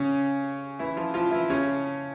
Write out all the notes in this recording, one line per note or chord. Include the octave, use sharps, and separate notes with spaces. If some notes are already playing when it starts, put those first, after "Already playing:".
Already playing: C#3 C#4
E3 E4
F3 F4
F3 F4
E3 E4
C#3 C#4